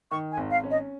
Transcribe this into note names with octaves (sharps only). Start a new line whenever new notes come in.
D#3 C#6
G#5
G#1
F5
C#4
D#5